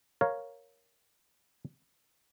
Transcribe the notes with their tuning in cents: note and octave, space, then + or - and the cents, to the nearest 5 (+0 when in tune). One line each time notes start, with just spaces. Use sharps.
A#4 +0 C#5 +0 F5 +0